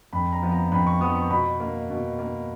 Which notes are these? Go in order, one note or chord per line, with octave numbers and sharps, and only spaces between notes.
F2 B5
A#5
F3 B3
A#5
F2 B5
C#6
F3 B3 D#6
C#6
B2 B5
A#3
B2
A#3